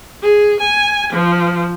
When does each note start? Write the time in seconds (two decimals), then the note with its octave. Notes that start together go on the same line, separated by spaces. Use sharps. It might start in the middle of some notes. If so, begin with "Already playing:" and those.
0.22 G#4
0.59 G#5
1.12 F3